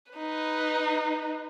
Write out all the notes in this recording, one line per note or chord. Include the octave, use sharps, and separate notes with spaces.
D#4 B4